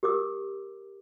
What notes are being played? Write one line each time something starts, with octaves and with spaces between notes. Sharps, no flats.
G4 A#4 D6 E6